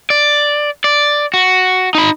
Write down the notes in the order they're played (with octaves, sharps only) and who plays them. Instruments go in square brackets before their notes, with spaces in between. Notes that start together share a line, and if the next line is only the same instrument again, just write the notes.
[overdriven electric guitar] D5
D5
F#4
D#4 B5